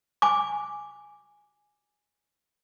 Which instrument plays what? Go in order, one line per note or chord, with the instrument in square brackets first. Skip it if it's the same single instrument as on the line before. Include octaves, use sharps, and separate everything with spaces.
[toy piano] G#5 D6